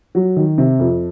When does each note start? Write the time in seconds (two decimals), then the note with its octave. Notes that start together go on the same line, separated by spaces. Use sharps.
0.15 F#3
0.36 D#3
0.58 C3
0.79 F2